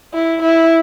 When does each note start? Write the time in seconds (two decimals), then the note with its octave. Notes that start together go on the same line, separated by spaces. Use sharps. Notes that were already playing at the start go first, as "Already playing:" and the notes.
0.14 E4
0.43 E4